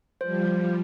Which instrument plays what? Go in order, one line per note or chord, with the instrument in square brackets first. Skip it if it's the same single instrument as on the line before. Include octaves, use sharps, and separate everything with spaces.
[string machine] F3 G3 [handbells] C5